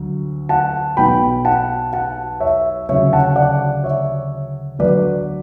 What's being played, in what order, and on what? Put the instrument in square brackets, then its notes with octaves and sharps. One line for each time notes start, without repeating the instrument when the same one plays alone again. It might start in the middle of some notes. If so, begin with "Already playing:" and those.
Already playing: [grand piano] D2 D3 F#3
F#5 A5
B1 B2 F#3 G5 B5
F#5 A5
F#5 A5
C#5 E5
D2 C#3 F#3 C#5 E5
F#5 A5
D5 F#5
C#5 E5
D2 D3 F#3 B4 D5